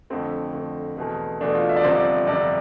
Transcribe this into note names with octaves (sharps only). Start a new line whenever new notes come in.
F2 D3 A3 C4
F2 D3 A3
E2 B2 A3
E2 B2 A3 D4
F4
E5
D5
G1 F2 C3 F3 C5
D5
G1 F2 C3 F3 D5